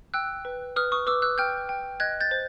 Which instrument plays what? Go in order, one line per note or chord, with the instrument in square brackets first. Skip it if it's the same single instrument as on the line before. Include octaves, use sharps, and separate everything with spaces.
[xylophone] G5 E6 F#6
B4
B4 D#6 F6
C#6 D#6
B4 D6 E6
E6 F#6
G5 F6 G6
G5
D#5 F#6 G#6
G6 A6
C5